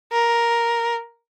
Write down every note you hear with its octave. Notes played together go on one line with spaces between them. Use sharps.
A#4